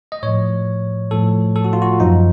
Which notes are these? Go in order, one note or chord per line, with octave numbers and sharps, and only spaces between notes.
D#5
A2 F3 C#5
A2 F3 A4
A4
F#4
F4
F#4
F#2 F3 D#4